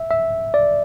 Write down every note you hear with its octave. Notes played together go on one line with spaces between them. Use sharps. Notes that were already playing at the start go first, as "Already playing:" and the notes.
Already playing: E5
E5
D5